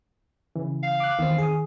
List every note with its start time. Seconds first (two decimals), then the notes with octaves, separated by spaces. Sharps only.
0.56 C#3 E3
0.83 F5
1.00 D6 F#6
1.19 E2 D#3 C4
1.38 G#4 D#6